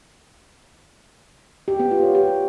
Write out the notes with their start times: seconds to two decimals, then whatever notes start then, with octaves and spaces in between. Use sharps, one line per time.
1.68 G4
1.80 B3
1.91 F4
2.03 C#5
2.15 G4